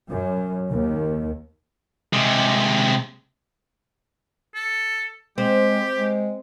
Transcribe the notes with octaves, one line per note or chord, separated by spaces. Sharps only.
F#2
D#2
C3 G#3
A4
G#3 C4 G4
G#3